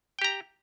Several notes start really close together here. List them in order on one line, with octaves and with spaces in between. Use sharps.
G5 G4 A#5